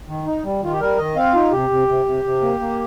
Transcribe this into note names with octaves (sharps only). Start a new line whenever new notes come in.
D#3
D#4
G3
D#3 F4
G4
G3 A#4
D#3 D#5
C4 F5
D#4 F4
C3 G4
C3
C3
C3
C3
A#3
A#3